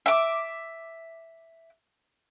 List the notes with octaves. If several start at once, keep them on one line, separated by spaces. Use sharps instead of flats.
E5 D6